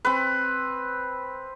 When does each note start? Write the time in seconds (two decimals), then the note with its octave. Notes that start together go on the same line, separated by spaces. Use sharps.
0.05 C4 B4